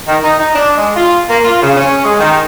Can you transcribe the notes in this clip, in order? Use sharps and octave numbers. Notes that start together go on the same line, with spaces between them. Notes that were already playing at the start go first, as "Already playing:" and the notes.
D#3
D#4
D#4
D4
G#3
F4
A#3
F4
C#3
C#4
G#3
D#3